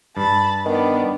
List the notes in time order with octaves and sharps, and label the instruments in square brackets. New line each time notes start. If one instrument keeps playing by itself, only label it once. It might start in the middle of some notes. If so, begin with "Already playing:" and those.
[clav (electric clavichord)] G2 [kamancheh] A5 B5
[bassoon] D#3 [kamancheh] B3 D4